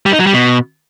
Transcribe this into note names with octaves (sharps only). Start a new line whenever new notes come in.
G3
D#4
F#3
G3
B2